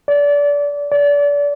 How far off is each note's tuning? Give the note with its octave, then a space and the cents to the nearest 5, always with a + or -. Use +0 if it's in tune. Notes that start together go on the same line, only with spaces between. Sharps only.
D5 -25
D5 -30